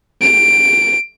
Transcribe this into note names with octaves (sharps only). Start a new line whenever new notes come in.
D7